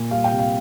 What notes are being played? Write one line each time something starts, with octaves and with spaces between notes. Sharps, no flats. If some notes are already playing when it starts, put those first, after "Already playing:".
Already playing: A#2
G3 F5
G5
C3
F5